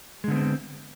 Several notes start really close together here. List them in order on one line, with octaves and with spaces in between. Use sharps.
G#3 D3 B3 C4